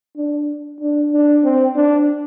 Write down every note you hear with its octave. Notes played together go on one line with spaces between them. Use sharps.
D4
D4
D4
C4
D4